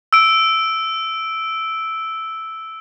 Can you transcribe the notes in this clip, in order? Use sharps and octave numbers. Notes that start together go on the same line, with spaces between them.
E6 D7